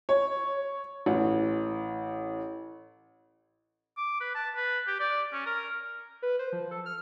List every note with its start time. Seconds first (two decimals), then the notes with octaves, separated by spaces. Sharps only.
0.09 C#5
1.06 A1
3.97 D6
4.21 B4
4.35 A5
4.56 B4
4.87 G4
5.00 D5
5.33 C#4
5.46 A#4
6.22 B4
6.39 C5
6.53 F3
6.71 A4
6.86 F6